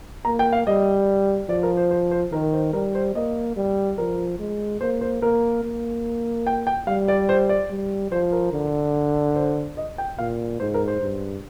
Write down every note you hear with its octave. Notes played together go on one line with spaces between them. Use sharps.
A#3 A#5
G5
F5
G3 D#5
F3 D5
A#4
C5
C5
C5
D#3 A#4
C5
G3 A#4
C5
A#3 D#5
G3
F3 A#4
G#3
A#3 C5
C5
A#3 A#4
A#3
G5
G5
G3 F5
D5
C5
D5
G3
F3 C5
A#4
D3
C5
D#5
G5
A#2 F5
G#2 C5
A#4
C5
G2